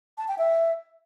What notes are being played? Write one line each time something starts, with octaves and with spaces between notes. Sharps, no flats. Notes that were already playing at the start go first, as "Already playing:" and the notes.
A5
G5
E5